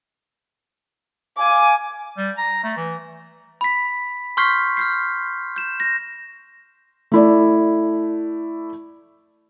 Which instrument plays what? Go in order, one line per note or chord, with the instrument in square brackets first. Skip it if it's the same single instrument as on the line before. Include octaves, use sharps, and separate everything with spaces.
[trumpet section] F5 G#5 [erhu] D6
[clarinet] G3
A#5
A3
E3
[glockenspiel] B5 B6
C6 C#6 F6 G6 B6 C7
F6 G6 C7
G6 E7
A#6
[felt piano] A3 E4 D5